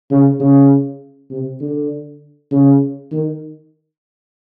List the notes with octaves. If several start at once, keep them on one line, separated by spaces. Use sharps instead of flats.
C#3
C#3
C3
D3
C#3
D#3